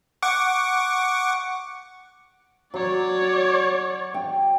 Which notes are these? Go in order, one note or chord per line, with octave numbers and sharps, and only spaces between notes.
F#5 C#6 D6
F#3 C#5 D5
G5